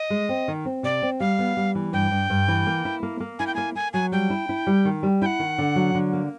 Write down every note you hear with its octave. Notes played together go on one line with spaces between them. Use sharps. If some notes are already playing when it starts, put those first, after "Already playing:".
Already playing: D#5
G#3
C4
D#3
C4
C3 D5
C4
G3 F5
B3
G3
E3
G2 G5
G2
G2
E3
A#3
E4
A#3
A#3
E4 G#5
G5
A#3 G#5
A#3 G#5
F#3 G#5
G3 G5
E4
E4
G3
D#3
G3
E4 F#5 G5
D#3
D3
F#3
D3
A#3